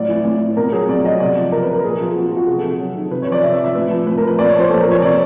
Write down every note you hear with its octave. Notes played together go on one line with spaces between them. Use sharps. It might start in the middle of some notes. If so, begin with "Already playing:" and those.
Already playing: A2 F#3 D5
E3
A2
E3
B2 A#4
F#3 G#4
B2 D5
F#3 D#5
C3 D5
F3
C3 A#4
B4
F3
A#4
A#2 G#4
G#4
F3
F4
A#2 F#4
F4
F3 F#4
C3 G#4
A4
C3
F#3
D#3
C3 B4
F3 C#5
D5
C3 E5
E5
F3
E5
A2 B4
F3
A2 B4
F3 A#4
B4
A#2 D5
C#5
F3
C5
A#2 A4
A#4
F3 C#5
C3 D5